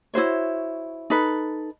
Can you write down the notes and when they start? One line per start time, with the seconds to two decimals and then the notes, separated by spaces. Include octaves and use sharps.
0.14 E4 F#4 C5 C#5
1.10 D#4 A4 B4